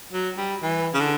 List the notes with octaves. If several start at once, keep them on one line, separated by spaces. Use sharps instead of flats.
F#3
G3
E3
C#3
D3